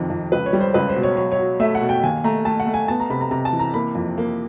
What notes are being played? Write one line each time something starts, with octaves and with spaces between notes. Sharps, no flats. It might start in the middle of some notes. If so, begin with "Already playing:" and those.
Already playing: F2 C3 D#3
F2
C#2 B4
C#5
G3
C5
C#2 B4
C5
B2
C#5
F#3 C#5
C#5
F#3
A3 E5
F#5
B2
G5
D#2 G#5
A3 A#5
A3 A5
F#5
A3
G#5
B3 A5
A#5
C3 B5
A#5
C3 A#5
A5
E3
A#5
A#3 B5
F2
A#3